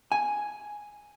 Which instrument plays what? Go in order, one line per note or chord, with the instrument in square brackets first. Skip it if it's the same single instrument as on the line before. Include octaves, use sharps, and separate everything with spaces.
[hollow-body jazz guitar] G#5